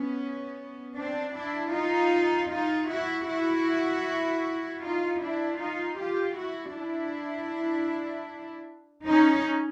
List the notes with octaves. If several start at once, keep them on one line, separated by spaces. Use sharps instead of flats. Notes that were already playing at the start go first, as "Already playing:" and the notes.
Already playing: B3 C#4
C4 D4
D4 E4
D#4 F4
D#4 F4
E4 F#4
E4 F#4
D#4 F4
D4 E4
D#4 F4
F4 G4
E4 F#4
D4 E4
C#4 D#4